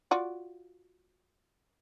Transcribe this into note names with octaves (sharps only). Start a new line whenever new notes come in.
F4 F#4 D5